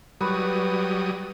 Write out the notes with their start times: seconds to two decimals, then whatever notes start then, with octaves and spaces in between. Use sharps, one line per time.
0.21 F#3 G3 B4 C#6 D#6